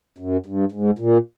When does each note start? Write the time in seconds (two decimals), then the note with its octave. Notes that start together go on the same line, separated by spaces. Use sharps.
0.18 F#2
0.46 G2
0.72 G#2
0.99 A#2